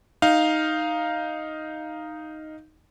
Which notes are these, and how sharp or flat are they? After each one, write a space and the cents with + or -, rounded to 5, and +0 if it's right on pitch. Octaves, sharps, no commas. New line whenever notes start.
D#4 +0 F5 +0